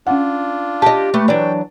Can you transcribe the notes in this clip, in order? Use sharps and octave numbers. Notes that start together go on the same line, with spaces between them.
C#4 D4 F4 F#5
G4 D#5 A5
A3 G4 B4
E3 F#3 D4 G5